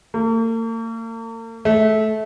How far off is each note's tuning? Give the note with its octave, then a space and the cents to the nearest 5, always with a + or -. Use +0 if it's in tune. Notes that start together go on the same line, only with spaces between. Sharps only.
A#3 -45
A3 -20